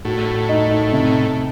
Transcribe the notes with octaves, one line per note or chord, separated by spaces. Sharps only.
A2 F#4
D#4
C3